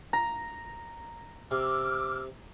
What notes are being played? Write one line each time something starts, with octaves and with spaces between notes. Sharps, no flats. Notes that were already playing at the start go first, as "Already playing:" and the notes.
A#5
C3 D6 E6 F6